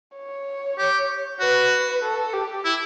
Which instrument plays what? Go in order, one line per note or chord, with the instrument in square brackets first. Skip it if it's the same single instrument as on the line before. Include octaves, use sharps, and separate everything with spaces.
[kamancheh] C#5
[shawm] G4
[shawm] F#4 [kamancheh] B4
[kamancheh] A4
G4
[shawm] E4